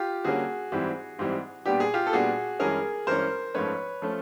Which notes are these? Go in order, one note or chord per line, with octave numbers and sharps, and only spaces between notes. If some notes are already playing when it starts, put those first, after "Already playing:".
Already playing: F4 G4
D3 G3 A#3 C#4 F#4 G#4
G#2 E3 G3 C4
G#2 E3 G3 C4
A#2 G3 B3 D4 G4
G#4
F4 G4
A4
A#2 G3 B3 D4 F#4 G#4
G2 E3 G#3 C#4 G#4 A#4
G2 E3 G#3 C#4 A#4 C5
G#2 F3 A3 C#4 B4 C#5
F3 A3 C#4